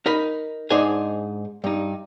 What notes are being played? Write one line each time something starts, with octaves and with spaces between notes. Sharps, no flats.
D#4 A#4 B5
G#2 D4 D#4 G#4 C5 G#5
G2 D#4